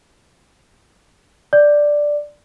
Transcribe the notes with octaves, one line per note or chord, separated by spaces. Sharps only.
D5